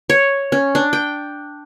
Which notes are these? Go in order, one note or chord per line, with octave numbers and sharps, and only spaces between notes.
C#5
C#4
D4
G5